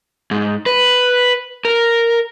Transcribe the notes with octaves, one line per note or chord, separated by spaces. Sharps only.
G#2
B4
A#4